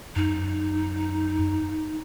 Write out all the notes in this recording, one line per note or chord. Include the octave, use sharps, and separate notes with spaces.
F#2 D#4